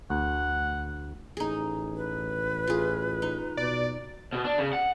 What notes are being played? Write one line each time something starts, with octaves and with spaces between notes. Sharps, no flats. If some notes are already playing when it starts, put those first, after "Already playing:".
D2 F#5
A1 D#4 G#4
B4
F4 G#4
D#4
B2 D5
B2
D4
C#3
F#5